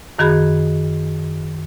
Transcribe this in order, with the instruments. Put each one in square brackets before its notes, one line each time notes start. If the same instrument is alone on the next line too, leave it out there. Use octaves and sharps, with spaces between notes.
[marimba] F#2 D#3 F#4 G#4 B5